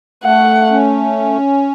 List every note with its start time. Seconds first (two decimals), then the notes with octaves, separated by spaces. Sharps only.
0.23 A3 F#5
0.71 C#4